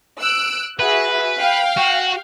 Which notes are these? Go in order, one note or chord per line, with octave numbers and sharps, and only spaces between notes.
E6 F#6 D7
F#4 G#4 B4 E5
F5 G5
F#4